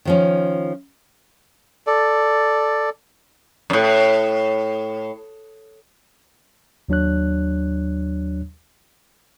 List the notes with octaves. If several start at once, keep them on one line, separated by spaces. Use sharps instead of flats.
D#3 F3 C#4
A4 D5
F#2 A2
D#2 F#3 D4 C#5 F#6